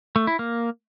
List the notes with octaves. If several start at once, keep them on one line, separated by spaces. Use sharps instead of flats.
A3
E4
A#3